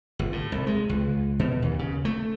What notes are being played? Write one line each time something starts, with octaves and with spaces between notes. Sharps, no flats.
G1
A2
C2
G#3
C#2
B2
D#2
C#3
A3